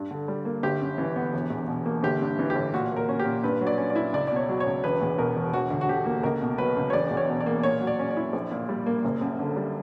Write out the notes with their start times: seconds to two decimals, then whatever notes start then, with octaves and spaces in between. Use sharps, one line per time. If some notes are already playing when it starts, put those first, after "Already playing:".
Already playing: G2
0.11 D3
0.28 G3
0.45 A#3
0.63 G1 G4
0.81 F#2
0.98 E3
1.16 B3
1.33 E1
1.50 E2
1.68 B2
1.85 A#3
2.03 G1 G4
2.21 G2
2.39 E3
2.50 G4
2.55 G1
2.74 A#2 F#4
2.91 A#3 A#4
3.09 C#4
3.19 G4
3.25 A#2
3.44 G2 B4
3.61 F#3
3.67 D5
3.78 C#4
3.90 D5
3.96 E4
4.13 C#2 D5
4.27 D5
4.32 B2 C#5
4.49 F#3
4.60 C#5
4.66 C#2
4.84 E1 B4
5.02 E2
5.18 B2 A#4
5.36 E1
5.53 E1 F#4
5.71 D2
5.81 F#4
5.89 D3 G4
6.06 A#3
6.23 C#2 A#4
6.41 B2
6.58 F#3 B4
6.77 C#2
6.90 C#5
6.93 E1 D5
7.11 E2
7.17 C#5
7.29 B2
7.40 D5
7.46 A#3
7.63 A#2 C#5
7.81 F#3
7.87 D5
7.99 C#4
8.11 D5
8.17 E4
8.33 A#1
8.51 A#2
8.69 G3
8.86 A#3
9.04 F#1
9.21 F#2
9.39 D3
9.56 G3